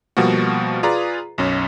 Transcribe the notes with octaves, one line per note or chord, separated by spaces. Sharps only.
B2 F3 G3 A#3 F#4
F4 G#4 B4 D5 A#5
B1 F#2 C#4